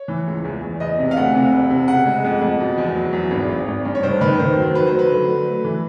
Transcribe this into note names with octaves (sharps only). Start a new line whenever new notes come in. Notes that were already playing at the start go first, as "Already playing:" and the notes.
Already playing: C#5
E3
C#2
E2
E2
E2 D#5
C3
F5
D2 F#5
C3
E1
C3
C#3 F#5
G#3
F2
F2
B2
E2
F#3
E2
G#1
G#1
G#1
G2
C#5
F1 C5
D#3 B4
D#3 C5
F#3 C5
F#3 B4
C5
F#3
B4
D3
F#3
A3
E3